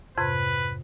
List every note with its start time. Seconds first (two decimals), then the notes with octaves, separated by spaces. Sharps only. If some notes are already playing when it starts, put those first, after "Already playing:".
0.18 F2 G#2 C3 B4